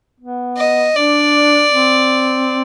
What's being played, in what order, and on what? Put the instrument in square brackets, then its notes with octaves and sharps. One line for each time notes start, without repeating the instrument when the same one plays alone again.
[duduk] B3
[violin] D#5
[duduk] D4 [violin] D5
[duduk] C4